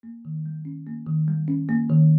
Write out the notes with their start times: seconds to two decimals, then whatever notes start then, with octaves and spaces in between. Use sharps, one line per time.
0.03 A#3
0.25 D#3
0.46 G3
0.65 C#4
0.87 A#3
1.06 D#3
1.28 G3
1.48 C#4
1.69 A#3
1.90 D#3